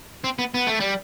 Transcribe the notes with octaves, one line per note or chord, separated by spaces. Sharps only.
C4
B3
B3
A3
G3